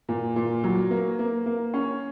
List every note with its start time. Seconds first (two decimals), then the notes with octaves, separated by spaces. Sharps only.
0.09 A#2
0.36 A#2
0.64 F#3
0.91 A#3
1.19 A#3
1.46 A#3
1.74 C#4